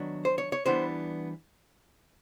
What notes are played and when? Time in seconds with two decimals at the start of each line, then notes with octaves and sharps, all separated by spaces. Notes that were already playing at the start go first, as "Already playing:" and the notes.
Already playing: D#3 F#3 B3 D4
0.25 C5
0.38 C#5
0.52 C#5
0.66 E3 G3 B3 D4 C5